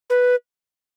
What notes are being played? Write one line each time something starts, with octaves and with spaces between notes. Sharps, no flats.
B4